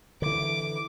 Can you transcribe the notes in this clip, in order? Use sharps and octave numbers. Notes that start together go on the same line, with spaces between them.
D3 E3 D6